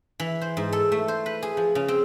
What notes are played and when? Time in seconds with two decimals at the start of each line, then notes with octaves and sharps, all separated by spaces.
0.20 E3
0.41 C5
0.57 G#2
0.72 A4
0.92 A3
1.08 C5
1.26 B4
1.43 G#4
1.57 F3
1.75 C#3
1.88 C4